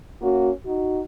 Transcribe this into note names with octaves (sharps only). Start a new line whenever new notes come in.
A#3 C#4 F#4
D#4 F#4